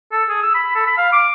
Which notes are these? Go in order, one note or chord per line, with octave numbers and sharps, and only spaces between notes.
A4
G#4
E6
B5
A4
B5
F5
D6